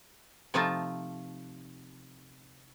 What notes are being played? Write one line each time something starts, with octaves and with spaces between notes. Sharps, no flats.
C3 F3 A3 D#4 F4 A5